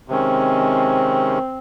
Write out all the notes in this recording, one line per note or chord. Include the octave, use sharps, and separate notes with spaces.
C3 D#3 G#3 C4 C#4